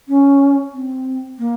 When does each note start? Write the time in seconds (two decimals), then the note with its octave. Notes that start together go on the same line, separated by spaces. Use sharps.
0.09 C#4
0.73 C4
1.39 A#3